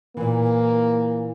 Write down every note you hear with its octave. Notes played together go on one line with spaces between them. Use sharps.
A#2 E3 A#3